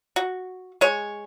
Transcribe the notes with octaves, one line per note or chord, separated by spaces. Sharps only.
F#4
G#3 C#5